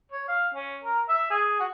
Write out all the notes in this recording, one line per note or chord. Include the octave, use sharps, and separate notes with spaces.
C#5
F5
C#4
A#4
E5
G#4
F#4